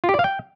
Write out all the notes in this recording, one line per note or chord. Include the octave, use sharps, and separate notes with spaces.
F4
G4
D5
F5
G5